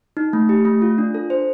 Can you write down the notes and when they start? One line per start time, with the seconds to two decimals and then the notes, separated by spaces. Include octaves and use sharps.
0.17 D#4
0.33 A3
0.49 G4
0.65 A3
0.82 F4
0.98 D4
1.15 A4
1.30 C5